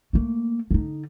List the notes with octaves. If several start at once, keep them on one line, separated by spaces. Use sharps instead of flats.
A3 A#3
D3 D#4